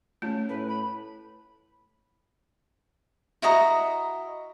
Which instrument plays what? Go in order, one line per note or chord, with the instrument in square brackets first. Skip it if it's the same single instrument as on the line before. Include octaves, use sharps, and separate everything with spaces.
[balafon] A3 [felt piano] C#4 F4 A5
[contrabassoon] A2 [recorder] B4
[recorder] B5
[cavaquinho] E4 F#4 D#5 A#5